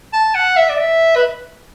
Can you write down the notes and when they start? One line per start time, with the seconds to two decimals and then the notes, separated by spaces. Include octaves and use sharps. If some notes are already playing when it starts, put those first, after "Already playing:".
0.13 A5
0.35 F#5
0.57 E5
0.69 D5
0.78 E5
1.16 B4